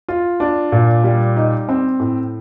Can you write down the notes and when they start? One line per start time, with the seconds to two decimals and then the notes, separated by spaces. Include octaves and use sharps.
0.09 F4
0.40 D4
0.72 A#2
1.04 G3
1.36 D#4
1.69 C4
2.00 A2